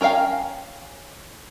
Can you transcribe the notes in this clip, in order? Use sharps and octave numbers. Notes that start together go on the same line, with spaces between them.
C#4 A#4 C5 F5 G5